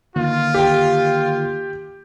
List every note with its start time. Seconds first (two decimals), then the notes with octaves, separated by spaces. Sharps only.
0.16 D3 D#3 A#3 F4
0.54 G4 G5